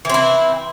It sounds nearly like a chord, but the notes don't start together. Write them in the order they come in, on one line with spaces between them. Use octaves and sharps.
E3 C4 E4